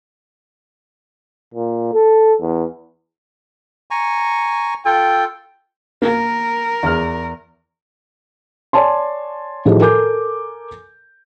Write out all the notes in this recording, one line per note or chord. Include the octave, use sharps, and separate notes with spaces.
A#2
A4
E2
G#5 A#5 C#6
F4 A4 G5
A#3 A#4
E2 F6
C#5 D5 G#5 A5 C6
A2 D#3 F3 G4 G#4
A4 A#4 G#5 D6 G6